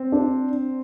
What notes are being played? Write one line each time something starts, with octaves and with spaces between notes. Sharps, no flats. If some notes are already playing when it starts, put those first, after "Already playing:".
Already playing: C4
D4